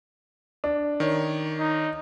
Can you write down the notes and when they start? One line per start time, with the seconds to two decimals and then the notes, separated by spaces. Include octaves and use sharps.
0.64 D4
1.00 D#3 C#5
1.59 D#4